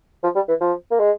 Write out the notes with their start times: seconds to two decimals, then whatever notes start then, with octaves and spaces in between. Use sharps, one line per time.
0.23 F3
0.35 G3
0.48 E3
0.61 F3
0.91 A#3
1.00 G#3